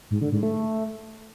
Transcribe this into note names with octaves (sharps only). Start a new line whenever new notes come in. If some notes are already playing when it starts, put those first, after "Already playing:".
G#2
D3
G#2
A3